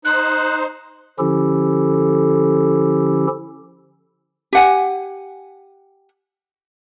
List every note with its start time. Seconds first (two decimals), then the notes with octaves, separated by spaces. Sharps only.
0.05 D#4 C5 F#6
1.19 D3 F3 C#4 E4 G4 A4
4.53 G4 F#5 G#5